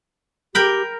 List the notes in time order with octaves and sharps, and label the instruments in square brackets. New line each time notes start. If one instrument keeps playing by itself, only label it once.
[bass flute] G4 [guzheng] A#4 G5 B5